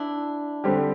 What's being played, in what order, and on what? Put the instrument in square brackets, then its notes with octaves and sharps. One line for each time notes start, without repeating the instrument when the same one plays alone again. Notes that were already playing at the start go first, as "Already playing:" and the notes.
Already playing: [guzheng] D4 E4
[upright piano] D3 G3 C4 G4